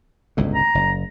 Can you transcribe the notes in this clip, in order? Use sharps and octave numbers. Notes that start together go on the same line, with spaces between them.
G1 C#2 A2
A#5
F#1